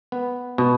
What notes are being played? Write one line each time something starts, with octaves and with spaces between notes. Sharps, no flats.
B3
B2